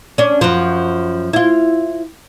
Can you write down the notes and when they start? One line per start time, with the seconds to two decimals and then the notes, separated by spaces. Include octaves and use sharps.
0.18 C#4 D4
0.41 F#2 F3
1.33 E4 F4